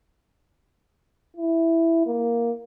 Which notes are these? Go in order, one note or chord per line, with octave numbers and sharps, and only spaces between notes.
E4
A#3